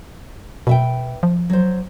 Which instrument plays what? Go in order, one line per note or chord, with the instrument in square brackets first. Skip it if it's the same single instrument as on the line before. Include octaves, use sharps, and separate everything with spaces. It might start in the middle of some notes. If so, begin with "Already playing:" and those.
[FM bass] B2 [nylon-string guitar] B4 E5 G5
[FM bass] F3
[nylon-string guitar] F#3 C5